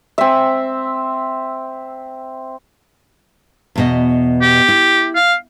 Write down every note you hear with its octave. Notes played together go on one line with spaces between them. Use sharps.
C4 E5
E2 B2 D#5
G4
E4
F5